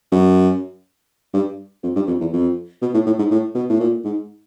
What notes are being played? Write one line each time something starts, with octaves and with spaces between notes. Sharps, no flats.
F#2
G2
F2
G2
F2
E2
F2
B2
A2
A2
G#2
A2
B2
A2
A#2
G#2